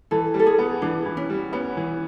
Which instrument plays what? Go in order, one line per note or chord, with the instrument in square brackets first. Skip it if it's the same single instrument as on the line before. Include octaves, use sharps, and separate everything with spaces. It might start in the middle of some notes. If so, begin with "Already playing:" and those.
[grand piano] E3 [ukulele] A4
[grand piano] G3
[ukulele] A4
G#4
[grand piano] B3
[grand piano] E3 [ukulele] D4
[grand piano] E3
[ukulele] C#4
[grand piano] G3
[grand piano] B3 [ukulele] C#4
[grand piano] E3